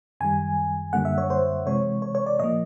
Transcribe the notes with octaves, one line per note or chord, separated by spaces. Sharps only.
F#2 D#3 G3 G#5
F#2 D3 G3 A#3 F#5
E5
C#5
C5
C3 E3 G#3 C#5
C#5
C#5
D5
A#2 F3 A#3 D#5